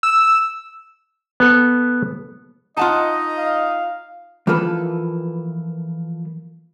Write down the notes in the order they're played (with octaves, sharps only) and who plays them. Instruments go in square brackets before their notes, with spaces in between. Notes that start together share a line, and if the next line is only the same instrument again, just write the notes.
[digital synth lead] E6
[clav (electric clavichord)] B3 A4
[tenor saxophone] D#4 [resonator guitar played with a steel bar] F4 F#5 A5 [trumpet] D#5
[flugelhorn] F5
[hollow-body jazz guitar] E3 F3 A#3 F4 A4 B4